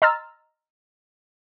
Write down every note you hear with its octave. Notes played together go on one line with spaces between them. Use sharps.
D#5 A#5 C6 E6 F6 A6